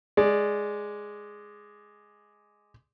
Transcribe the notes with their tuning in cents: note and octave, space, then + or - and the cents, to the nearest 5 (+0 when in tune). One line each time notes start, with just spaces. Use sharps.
G#3 +0 D5 +0